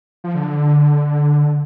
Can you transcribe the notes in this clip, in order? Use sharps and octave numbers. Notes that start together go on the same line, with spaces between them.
F3
D3